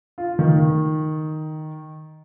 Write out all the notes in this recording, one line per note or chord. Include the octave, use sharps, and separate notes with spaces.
F4
D#3